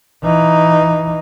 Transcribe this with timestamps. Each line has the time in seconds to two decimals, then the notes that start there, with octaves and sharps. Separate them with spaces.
0.23 E3 D#4